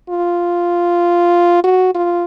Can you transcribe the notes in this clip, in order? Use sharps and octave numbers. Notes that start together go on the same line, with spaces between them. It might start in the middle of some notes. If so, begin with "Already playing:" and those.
F4
F#4
F4